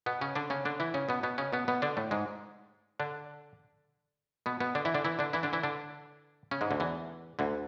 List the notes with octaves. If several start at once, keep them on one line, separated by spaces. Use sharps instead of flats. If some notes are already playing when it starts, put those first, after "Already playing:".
B2 B3
C#3 C#4
D3 D4
C#3 C#4
D3 D4
E3 E4
C#3 C#4
B2 B3
B2 B3
C#3 C#4
B2 B3
B2 B3
D3 D4
A2 A3
G#2 G#3
D3 D4
B2 B3
B2 B3
D3 D4
E3 E4
D3 D4
E3 E4
D3 D4
E3 E4
D3 D4
E3 E4
D3 D4
C#3 C#4
G#2 G#3
D2 D3
E2 E3
D2 D3